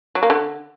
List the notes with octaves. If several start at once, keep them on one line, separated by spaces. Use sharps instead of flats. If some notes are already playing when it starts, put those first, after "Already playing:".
F#3
A#3
D3